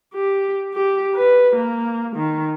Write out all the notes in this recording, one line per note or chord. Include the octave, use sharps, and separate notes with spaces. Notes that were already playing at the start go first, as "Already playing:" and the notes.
G4
G4
B4
A#3
D#3